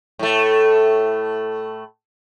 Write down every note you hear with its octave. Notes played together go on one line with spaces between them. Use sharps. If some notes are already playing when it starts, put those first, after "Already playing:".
A2 A3